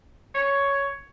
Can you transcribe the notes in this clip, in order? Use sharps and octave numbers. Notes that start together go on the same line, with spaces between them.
C#5